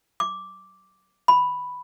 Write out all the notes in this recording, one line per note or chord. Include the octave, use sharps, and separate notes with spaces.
D6
B5